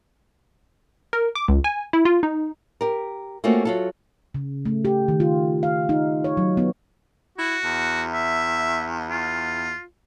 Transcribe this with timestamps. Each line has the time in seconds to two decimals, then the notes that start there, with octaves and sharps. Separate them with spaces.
1.13 A#4
1.35 D6
1.48 C#2
1.64 G#5
1.93 E4
2.05 F4
2.23 D#4
2.81 G4 A#4
3.44 A3 A#3 C4 C#4 F4 F#4
3.65 F#3 F4 A4
4.35 C#3
4.65 A3
4.85 G4
5.08 D#3
5.20 F4
5.63 F5
5.89 D#4
6.24 C#5
6.37 F#3
6.57 B3
7.38 E4 F#4
7.64 E2
8.13 E5
9.10 F4